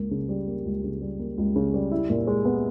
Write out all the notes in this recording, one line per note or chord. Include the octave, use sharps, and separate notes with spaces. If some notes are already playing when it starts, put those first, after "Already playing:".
Already playing: C#2 A#3
C#3
G3
A#3
C#2
C#3
G3
A#3
C#2
C#3
G3
E4
A#2
G#3
B3